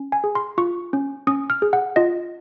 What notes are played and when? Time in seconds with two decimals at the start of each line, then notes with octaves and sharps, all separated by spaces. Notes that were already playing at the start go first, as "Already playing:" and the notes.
Already playing: C#4
0.12 G#5
0.24 G#4
0.35 C6
0.58 F4 C#6
0.93 C#4
1.27 C#4 D#6
1.50 F6
1.62 G#4
1.73 F#5
1.96 F4 D#5